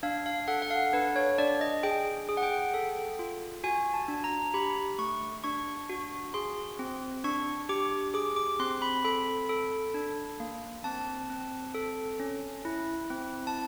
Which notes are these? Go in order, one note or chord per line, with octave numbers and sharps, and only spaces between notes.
D4 F5
F5
A4 F#5
F#5
F5
D4 B4
C#5
D4 D5
D#5
G#4 G5
G#4
F#5
G5
A4
F4
F#4 G#5
A5
D4
A#5
G4 B5
A3 C#6
D4 C#6
F#4
G#4 C6
C4
D4 C#6
G4 D6
G#4 D6
D6
C4 C6
B5
A4 B5
A4
D4
A#3
C4 A5
C4
A4
C#4
E4
C4
A5